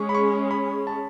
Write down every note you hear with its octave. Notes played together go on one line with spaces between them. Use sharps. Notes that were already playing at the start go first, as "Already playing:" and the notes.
Already playing: G#3 C#4 G#4 C#6
B5
C#6
B5
A5